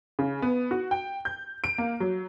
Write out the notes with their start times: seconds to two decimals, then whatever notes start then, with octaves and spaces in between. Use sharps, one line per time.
0.19 C#3
0.42 B3
0.71 F#4
0.91 G5
1.25 G6
1.64 D7
1.78 A#3
2.00 F#3